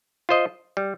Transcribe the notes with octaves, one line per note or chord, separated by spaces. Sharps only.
F4 C5 D#5
G3